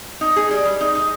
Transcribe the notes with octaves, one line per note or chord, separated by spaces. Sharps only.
D#4
G#4
G3
G3
D#4
D#4